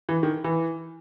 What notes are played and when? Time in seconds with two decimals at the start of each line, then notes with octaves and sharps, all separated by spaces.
0.09 E3
0.23 D#3
0.44 E3